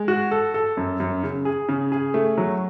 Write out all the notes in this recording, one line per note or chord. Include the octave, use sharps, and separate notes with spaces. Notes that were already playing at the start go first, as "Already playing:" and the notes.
Already playing: G#3
F#4
A4
A4
F#2
F#2
C#3
G#4
C#3
G#4
A3
F#3